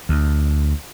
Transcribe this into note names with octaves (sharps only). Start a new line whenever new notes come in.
D2